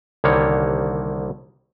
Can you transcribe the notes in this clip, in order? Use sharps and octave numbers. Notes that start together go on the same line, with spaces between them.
C2 D3 D#3 G3 A#3 C#5